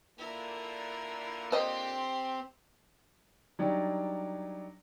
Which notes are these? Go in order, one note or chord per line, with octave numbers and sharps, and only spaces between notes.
A#2 D3 A#3 E4 A#4
C4 G4 C5 D#5 C6
F#3 G3 D4 D#4 G4 D5